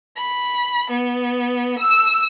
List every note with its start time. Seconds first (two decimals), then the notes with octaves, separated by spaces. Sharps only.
0.17 B5
0.90 B3
1.79 E6